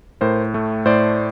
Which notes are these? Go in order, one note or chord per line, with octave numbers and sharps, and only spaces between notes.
A2 A#4 C5
A3
A2 C5 D5